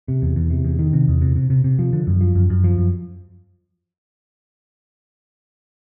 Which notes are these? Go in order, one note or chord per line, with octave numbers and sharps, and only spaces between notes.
C3
E2
E2
C3
E2
D#3
C3
E2
C3
C3
C3
C3
F3
D3
F#2
F3
F#2
F#2
F3
F#2